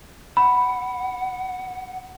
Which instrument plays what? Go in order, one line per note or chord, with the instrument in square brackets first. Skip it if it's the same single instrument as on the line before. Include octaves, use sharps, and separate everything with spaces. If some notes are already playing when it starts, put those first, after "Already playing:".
[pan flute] F#5 [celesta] B5